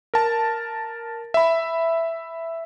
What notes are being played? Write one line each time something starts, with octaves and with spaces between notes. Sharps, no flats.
A#4 A5
E5 B5